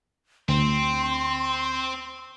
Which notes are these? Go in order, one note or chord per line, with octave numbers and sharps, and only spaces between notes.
D2 C4 C6